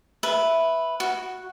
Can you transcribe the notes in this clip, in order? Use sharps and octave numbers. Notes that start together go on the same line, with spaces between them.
B4 E5
F#4